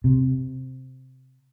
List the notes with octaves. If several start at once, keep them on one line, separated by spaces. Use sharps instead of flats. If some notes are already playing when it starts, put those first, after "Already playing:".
C3